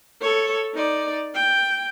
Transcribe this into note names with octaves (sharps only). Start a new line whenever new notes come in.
A4 C#5
D#4 D5
G5